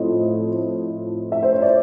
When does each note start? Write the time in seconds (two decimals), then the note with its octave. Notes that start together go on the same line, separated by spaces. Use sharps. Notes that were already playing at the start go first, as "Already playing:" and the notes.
Already playing: A2 F3 A3 C4 D#5
1.32 E5
1.43 C5
1.52 C#5
1.62 D5